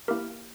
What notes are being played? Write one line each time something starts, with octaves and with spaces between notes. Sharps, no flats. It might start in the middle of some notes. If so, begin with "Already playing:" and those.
A#3 E4 G4 A#4